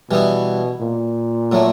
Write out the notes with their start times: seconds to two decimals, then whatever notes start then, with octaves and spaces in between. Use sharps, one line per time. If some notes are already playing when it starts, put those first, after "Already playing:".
0.10 B2 E3 G3 B3 E4
0.81 A#2
1.52 A2 F#3 A3